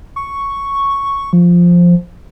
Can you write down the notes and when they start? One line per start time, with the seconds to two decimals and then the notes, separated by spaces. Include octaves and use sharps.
0.16 C#6
1.33 F3